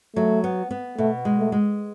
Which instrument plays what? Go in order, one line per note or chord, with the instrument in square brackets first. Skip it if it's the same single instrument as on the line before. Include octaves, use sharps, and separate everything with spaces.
[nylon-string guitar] F#3 [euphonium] A3
[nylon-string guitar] B3
B3
[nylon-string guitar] B2 [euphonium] A3
[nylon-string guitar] G#3
[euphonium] A3
[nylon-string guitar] G#3